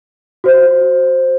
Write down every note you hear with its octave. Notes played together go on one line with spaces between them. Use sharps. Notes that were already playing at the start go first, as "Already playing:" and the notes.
F#4 C5